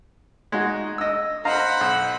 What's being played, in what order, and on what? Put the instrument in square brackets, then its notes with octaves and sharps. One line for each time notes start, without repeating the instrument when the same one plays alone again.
[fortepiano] G#3 D#4 F#4
D#5 E6
[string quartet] C5 F#5 B5 [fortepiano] D#5 F5 A#5
[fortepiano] B1